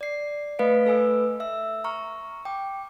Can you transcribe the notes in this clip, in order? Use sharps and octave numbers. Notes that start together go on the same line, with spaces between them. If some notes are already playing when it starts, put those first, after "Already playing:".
D5 C7
A3 B4 D#5 F5 B6 D7
A3 A4 B4 G#5 E6
E5 E6
A#5 C#6 F6
G5 D6